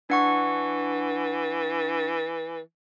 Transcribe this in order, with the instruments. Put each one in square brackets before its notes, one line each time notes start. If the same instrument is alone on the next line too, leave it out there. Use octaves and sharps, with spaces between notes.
[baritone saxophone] E3 [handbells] D4 F#5 C#6